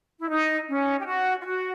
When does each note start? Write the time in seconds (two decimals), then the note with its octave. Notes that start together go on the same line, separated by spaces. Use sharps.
0.19 E4
0.30 D#4
0.68 C#4
0.99 G4
1.06 F#4
1.40 F4
1.45 F#4